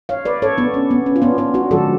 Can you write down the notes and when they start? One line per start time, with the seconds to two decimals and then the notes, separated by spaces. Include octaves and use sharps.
0.09 C#5 F5
0.25 B4 D5
0.42 A4 C#5
0.58 B3 D4
0.74 C#4
0.91 B3
1.06 C#4
1.16 F4
1.22 B3 D4
1.38 B3 D4
1.54 D4 F#4
1.71 D3 F3 G#3 F#4 A4